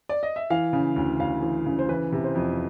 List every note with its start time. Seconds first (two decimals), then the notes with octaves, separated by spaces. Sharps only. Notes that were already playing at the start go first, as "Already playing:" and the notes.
0.09 D5
0.23 D#5
0.36 E5
0.50 E3 F5
0.73 C#3
0.96 D2
1.20 D2 F5
1.43 E3
1.66 C#3
1.79 C5
1.89 E3 B4
2.12 C3
2.24 C5
2.35 F2